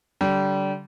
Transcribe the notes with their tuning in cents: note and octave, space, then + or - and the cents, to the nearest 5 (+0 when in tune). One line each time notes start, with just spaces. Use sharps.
D3 -25 G3 -25